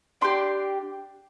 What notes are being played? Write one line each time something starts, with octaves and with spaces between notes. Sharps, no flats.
D4 G4 C6